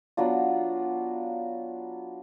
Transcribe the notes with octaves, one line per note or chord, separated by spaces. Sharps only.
F#3 B3 D4 F4